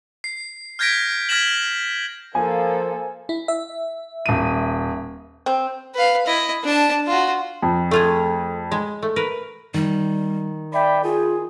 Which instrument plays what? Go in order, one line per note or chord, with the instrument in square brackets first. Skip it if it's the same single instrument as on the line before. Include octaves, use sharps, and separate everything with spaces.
[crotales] C7
F6 G6 G#6 A#6 B6 D7
F6 G#6 A#6 B6 E7 F#7
[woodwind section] F3 [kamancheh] A#3 A4 [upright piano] G#5
[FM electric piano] E4
E5
[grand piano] D#1 D#7
[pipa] C4
[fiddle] B4 F5
E4 D#5
D4 A5
F4 F#4
[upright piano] F2
[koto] A3 F4 G#4
G#3
A3
A#4 B4
[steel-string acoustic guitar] D#3 [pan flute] G3
[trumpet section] D5 G5 B5 [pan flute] E5
[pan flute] F4 [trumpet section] G#4